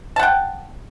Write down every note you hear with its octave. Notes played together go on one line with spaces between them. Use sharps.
F#5 G5 A5